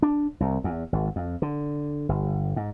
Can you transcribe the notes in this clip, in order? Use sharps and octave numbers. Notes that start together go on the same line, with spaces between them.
D4
C2
E2
G#1
F2
D3
G1
G#2